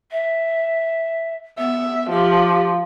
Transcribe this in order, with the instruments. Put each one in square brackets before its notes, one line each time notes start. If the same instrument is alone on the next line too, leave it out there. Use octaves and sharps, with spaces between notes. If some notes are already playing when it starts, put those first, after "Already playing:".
[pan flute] E5
[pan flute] B3 [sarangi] E5
[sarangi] F3 [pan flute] G4